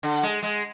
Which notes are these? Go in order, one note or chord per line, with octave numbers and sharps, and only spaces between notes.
D3
G#3
G#3